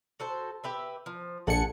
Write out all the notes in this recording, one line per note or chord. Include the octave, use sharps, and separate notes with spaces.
F#4 A4 C5
G4 B4 E5
F3
A#1 A4 F#5 G#5 C#7